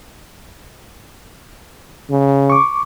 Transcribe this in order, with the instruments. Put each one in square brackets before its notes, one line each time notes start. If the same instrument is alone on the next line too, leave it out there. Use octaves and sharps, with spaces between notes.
[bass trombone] C#3
[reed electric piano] C#6 D6